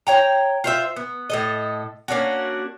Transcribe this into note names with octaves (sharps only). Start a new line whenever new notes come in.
C#5 G5 A#5
F4 C5 E5
B3
A2 A4 D#5
A#3 C#4 D4 F#4